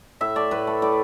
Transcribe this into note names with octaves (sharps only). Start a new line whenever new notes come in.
A2 E5
A3 D5
A2 B4
A3
A2 D5